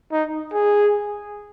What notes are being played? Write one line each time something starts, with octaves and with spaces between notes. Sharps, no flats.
D#4
G#4